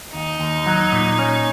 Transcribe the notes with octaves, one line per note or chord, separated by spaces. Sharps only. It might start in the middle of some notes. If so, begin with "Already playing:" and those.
D#2 D#4
D#2
F#3
A#2
C#4